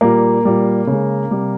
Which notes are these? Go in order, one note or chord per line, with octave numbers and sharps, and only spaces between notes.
A#2 G3 A#3
A#2 G3
C#3 G#3
C3 G3